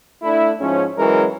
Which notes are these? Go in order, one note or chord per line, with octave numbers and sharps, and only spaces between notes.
A3 D4 E4
G#2 F3 C#4
E3 F#3 G#3 C#4 A#4